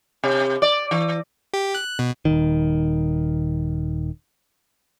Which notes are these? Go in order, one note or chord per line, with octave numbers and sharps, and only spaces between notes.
C3
D5
E3
G4
F#6
B2
D#1 A#1 D#3